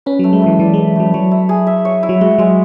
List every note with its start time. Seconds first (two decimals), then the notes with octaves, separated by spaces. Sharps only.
0.06 C#4 B4
0.19 F#3 A3
0.33 G#3
0.42 E3 E4
0.59 E3 D5
0.73 G#3 B4
0.96 F#3 A3
1.14 F#3 C#5
1.31 E4
1.49 G#4
1.67 E5
1.85 C#5
2.03 E4
2.09 F#3
2.21 G#3 F#4
2.38 F#3 G#3